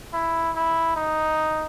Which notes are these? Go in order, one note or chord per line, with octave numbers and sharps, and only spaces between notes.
E4
E4
D#4